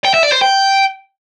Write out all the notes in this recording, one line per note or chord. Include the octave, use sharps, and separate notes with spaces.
G5
E5
D5
C5
G5